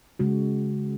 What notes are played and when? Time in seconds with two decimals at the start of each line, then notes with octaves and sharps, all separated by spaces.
0.19 C#3 G#3 F#4